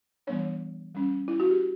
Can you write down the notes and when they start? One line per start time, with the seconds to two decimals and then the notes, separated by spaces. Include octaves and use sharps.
0.27 E3 G3 B3 D4 C#5
0.95 G3 C#4
1.28 E4
1.40 F#4
1.51 G4